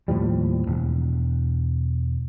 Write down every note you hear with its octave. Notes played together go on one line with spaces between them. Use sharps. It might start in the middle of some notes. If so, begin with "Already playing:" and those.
D#2 A2 F3 G3
E1